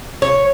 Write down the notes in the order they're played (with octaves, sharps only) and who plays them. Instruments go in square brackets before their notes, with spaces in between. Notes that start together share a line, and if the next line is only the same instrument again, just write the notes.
[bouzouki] C#5